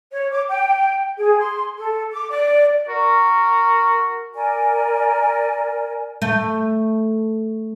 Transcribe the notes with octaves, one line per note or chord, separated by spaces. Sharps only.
C#5
D6
G5
G#4
C6
A4
D6
D5
F#4 A#4
A#4 D5 G#5
A3